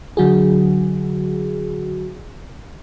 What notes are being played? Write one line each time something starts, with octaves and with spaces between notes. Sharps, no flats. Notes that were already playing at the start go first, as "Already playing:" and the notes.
D3 F#3 F#4 G#4